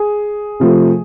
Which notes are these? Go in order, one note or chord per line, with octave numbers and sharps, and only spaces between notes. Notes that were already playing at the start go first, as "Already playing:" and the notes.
Already playing: G#4
C3 F3 A3